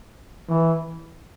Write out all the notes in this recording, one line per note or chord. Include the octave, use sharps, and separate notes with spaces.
E3